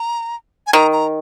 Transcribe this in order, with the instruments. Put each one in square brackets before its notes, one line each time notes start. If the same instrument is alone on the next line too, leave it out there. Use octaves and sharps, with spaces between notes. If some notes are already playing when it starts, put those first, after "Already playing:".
Already playing: [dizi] A#5
G#5
[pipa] D#3 [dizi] A#5
[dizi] A#5